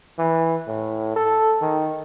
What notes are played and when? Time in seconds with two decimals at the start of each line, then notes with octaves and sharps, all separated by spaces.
0.19 E3
0.68 A2
1.16 A4
1.62 D#3